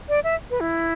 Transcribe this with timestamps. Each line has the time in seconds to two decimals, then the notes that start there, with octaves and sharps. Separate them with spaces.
0.09 D5
0.24 E5
0.51 B4
0.60 E4